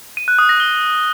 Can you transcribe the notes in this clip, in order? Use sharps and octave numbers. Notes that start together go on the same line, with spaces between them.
D#7
F#6
D#6
A#6
G7